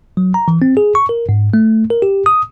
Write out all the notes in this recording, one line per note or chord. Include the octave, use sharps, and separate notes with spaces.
F#3
A#5
E3
C4
G#4
C#6
A#4
G#2
A3
A#4
G4
D#6